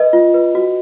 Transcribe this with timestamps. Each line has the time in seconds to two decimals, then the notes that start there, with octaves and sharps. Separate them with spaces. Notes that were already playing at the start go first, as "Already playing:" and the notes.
Already playing: B4 D#5
0.13 F4
0.34 B4
0.55 F#4